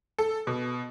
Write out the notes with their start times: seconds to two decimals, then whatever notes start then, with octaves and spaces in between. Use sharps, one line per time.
0.18 A4
0.47 B2